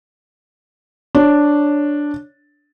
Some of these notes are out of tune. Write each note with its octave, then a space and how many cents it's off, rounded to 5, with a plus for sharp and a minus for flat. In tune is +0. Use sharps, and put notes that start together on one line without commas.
D4 +0 C#5 +0